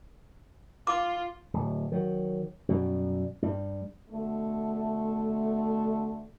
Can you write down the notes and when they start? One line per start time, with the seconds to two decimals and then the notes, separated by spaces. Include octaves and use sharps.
0.87 F4 D6
1.53 D1
1.92 D#3 F#3
2.69 F#2 B2 G3
3.42 G2 G3
4.10 B2 D3 A3